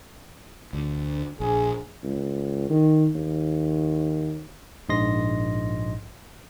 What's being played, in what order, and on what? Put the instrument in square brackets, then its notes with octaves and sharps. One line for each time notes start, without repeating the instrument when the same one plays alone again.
[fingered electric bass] D2
[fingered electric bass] A#1 [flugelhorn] G#4
[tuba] C#2
D#3
D#2
[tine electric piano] A#1 G#2 D#5 C6 A#6